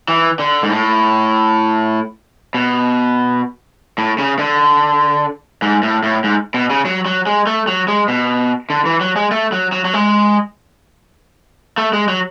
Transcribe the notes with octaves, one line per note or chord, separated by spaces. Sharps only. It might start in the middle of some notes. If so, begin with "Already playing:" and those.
E3
D3
G#2
A2
B2
A2
C#3
D3
G#2
A2
A2
G#2
B2
C#3
F#3
F#3
G#3
A3
F#3
G#3
B2
D3
E3
F#3
G#3
A3
F#3
F#3
F#3
G#3
A3
G#3
F#3